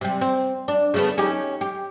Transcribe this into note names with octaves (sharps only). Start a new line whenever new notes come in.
C3 G3
C4
D4
C#3 A3 B3
C#4 D#4 G4
G4